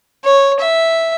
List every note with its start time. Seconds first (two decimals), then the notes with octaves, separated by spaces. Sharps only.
0.25 C#5
0.60 E5